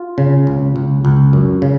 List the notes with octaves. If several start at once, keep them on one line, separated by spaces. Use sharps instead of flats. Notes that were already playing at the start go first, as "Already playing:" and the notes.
Already playing: F4
C#3
C#2
C#2
C#2
F#2
C#3